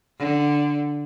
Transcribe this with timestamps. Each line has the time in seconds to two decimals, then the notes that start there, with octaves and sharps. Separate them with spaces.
0.19 D3